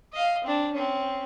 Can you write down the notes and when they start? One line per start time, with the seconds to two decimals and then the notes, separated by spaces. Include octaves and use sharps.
0.13 D#5 F5
0.44 C4 D4
0.73 C4 C#4